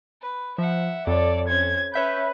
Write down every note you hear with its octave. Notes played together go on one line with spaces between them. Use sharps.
B4
F3 E5 F#5
F2 A4 C#5 D5
C#4 C5 G#6
C#4 B4 C#5 E5 G6